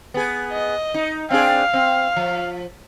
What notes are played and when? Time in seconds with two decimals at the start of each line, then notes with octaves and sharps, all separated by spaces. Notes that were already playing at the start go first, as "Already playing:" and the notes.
0.14 B3 G#4
0.52 D#5
0.94 D#4
1.31 C4 D4 G#4 F5
1.73 C4
2.16 F3